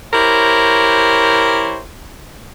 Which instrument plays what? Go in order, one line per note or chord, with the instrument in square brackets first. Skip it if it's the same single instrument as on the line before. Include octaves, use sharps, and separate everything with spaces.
[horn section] E4 G4 A#4 C5 C#5